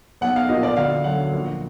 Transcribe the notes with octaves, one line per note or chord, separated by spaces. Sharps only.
B1 F#5
F5
A#2 F3 A#3 D#5
D5
D2 F5
D3 F#3 F#5
A#1